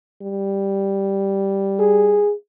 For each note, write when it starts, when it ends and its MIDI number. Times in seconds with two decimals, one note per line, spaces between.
0.22 2.23 55
1.79 2.33 68